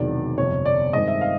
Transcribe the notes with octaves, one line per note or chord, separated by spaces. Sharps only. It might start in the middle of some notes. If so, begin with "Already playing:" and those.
Already playing: E1 E2 C3 D#3 F#3 D5
G1 F2 C3 C#5
D5
G2 D#3 G#3 C4 D#5
E5
F5